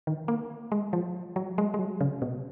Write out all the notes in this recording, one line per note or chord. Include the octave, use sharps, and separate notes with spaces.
D#3
A#3
G#3
F3
F#3
G#3
G#3
F#3
C#3
B2